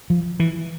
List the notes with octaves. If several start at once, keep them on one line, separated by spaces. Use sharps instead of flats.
F3
E3